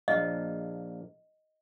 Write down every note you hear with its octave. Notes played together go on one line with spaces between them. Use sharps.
A#1 A#3 D#5